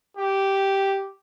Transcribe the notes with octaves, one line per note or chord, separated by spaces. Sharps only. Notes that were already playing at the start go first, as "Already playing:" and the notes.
G4